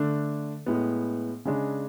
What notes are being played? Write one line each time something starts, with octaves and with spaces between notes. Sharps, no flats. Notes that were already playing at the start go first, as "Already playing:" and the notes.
Already playing: D3 A3 D4
A2 G#3 B3
C#3 G#3 D4